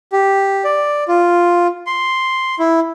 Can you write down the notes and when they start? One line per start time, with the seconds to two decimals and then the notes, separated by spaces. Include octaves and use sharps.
0.12 G4
0.64 D5
1.08 F4
1.87 C6
2.59 E4